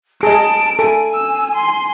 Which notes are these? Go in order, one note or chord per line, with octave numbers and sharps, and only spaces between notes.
G#4 D#5 A5 D7
A4 G#5
E6
C6